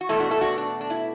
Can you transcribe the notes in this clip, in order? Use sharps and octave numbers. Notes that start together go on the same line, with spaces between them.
F#4
E2 B2 A3 E4 A4
D4 F#4
E4 A4
D4 F#4
D4
D4
E4